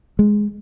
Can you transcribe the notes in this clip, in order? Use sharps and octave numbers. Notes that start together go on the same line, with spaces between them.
G#3